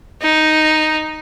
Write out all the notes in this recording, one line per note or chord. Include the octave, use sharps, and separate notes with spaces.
D#4